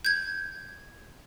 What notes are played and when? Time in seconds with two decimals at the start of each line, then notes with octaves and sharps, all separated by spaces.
0.05 G6 G#6